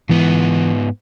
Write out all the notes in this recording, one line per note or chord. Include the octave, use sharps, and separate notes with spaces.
G#2 E3 B3